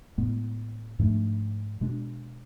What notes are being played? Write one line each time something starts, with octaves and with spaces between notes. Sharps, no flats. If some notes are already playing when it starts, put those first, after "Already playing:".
A2 G#3 B3
G#2 F3 A3 D4
B2 G#3 D4